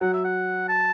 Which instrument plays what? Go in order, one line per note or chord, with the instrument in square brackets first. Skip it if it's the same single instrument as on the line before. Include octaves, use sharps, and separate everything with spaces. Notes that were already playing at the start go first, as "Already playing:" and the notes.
[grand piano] F#3 [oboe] F#5
[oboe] E5
F#5
A5